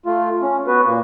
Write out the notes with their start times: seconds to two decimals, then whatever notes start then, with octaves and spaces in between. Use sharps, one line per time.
0.06 A3 F4
0.42 C#4
0.67 B3 F#4 B4
0.86 A#2 A#3